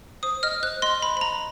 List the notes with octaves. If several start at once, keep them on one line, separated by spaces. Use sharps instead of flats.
C5 D#6
D#5 F6
C5 F#6
D#5 C6
C5 B5
B5
D#5 A#5